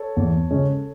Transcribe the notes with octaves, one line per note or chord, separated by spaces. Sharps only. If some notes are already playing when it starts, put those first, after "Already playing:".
Already playing: A4 C#5
E2
C#3 G#3 C#4